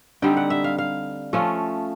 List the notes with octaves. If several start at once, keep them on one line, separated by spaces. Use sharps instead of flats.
D3 G3 C4 D#4 G5
F#5
E5
F5
F5
F3 A3 C#4 F4